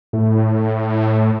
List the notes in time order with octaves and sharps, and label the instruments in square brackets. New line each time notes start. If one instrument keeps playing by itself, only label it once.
[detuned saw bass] A2